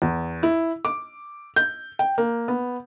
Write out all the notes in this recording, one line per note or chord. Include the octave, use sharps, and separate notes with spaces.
E2
E4
D6
G6
G5
A#3
B3